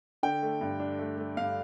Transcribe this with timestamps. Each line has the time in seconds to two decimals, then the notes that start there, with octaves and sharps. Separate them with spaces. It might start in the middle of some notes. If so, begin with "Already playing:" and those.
0.23 D3 G5
0.43 A3
0.61 G2
0.80 D4
0.99 A3
1.18 A3
1.37 G2 F5